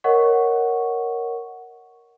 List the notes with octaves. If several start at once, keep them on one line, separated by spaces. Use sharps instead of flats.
A#4 C#5 D#5 F#5 C#6